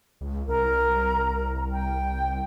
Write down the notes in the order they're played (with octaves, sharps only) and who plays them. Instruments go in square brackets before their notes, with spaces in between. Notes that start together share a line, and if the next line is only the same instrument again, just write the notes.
[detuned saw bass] C#2
[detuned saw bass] C2 [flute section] A#4 A#5
[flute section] G5